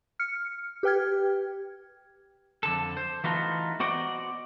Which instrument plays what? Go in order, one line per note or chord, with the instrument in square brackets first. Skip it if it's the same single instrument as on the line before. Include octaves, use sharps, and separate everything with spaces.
[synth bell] F6 C#7
G4 B4 G5 F6 G#6
[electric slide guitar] F2 D3 A4
C5
E3 A3 B3 D#4 F4 F#4
B3 F#4 C5 D5 D#5 F#5